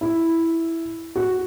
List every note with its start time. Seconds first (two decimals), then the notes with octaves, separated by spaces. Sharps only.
0.01 E4
1.16 F#4